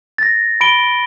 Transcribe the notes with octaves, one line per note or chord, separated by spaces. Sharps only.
A6 A#6
B5 D7 G7